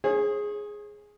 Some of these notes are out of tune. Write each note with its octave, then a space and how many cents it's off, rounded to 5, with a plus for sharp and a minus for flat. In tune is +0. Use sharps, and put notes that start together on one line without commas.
G#4 +0 C#5 -45